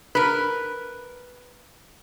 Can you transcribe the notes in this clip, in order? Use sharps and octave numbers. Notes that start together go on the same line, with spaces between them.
A#4 B4